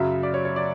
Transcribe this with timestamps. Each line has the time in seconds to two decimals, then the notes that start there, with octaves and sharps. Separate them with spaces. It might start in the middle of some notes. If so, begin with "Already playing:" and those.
Already playing: F#2 C#3 F#3 E5
0.23 D5
0.34 C#5
0.45 C#5
0.56 D5